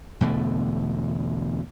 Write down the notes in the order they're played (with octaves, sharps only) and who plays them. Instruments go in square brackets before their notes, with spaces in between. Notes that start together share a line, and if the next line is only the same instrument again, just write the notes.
[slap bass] E2 B2 D3 A3